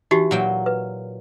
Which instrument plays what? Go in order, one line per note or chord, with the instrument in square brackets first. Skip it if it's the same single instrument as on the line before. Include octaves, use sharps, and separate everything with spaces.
[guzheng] E3 [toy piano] D#4 F#4 G4
[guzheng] A#2 F#3 G5
[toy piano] B4